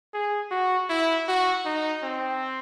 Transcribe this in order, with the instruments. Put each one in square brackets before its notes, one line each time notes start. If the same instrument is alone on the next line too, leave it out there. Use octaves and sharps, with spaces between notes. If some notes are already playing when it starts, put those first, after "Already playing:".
[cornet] G#4
F#4
E4
F#4
D#4
C4